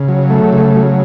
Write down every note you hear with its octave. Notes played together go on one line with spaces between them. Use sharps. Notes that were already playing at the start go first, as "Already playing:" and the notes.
Already playing: C#3
F#3
A3
C#3
F#3